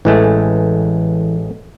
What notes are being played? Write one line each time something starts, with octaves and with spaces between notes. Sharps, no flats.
A1 E3 G#3 A3